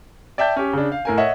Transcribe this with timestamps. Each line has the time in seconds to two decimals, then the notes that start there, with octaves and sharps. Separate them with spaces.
0.38 D5 E5 G5 A5 G6
0.56 C#4 G4
0.73 C#3 D4
0.92 F5
1.05 A2 A#4 G#5
1.17 C#5 D#5 E5 F#5